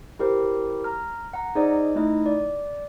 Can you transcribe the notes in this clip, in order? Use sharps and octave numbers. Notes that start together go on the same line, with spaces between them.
E4 G4 A#4 C5
A#5 F6
F#5 A#5
D#4 G#4 C5 D5 D#5
A3 D#4 E4 D#5
D5